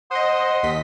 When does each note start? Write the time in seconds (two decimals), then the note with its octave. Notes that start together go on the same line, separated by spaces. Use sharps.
0.11 C5 D#5 F#5 C6 D#6
0.63 D#2 D#5 B6